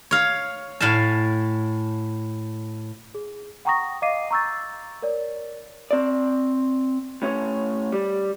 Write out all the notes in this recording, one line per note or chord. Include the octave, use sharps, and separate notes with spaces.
C#5 F5
A2 F5 G#5 A5
G#4
F#5 G5 A#5 C#6 D#6 A#6
D#5 F5 D6 C7 D#7
A#5 C#6 E6 G6 A6
A#4 C#5 D5
C4 D5
A2 C#4 C#5
G3